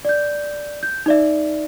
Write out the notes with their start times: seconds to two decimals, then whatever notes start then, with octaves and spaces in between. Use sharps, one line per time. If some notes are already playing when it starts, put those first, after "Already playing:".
0.05 D5 G6
0.83 G6
1.06 D#4 D5 E5